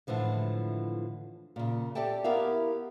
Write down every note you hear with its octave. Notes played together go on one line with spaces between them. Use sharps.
A2 D3 E3 F3 G#3
A#2 C#3
G4 A4 D5 E5 G5 A5
B3 E4 G4 A#4 E5 F5